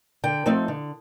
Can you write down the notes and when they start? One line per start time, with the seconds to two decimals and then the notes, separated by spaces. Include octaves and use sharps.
0.24 D3 G5
0.46 F3 A3 C4 D#4
0.68 D3